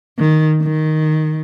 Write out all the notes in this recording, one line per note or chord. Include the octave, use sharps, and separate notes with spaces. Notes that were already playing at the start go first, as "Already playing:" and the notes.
D#3
D#3